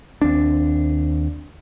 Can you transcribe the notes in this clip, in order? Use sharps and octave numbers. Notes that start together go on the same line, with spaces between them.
D#2 C4 D4